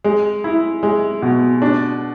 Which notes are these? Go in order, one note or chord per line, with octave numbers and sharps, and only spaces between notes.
G#3
E4
G#3
B2
D4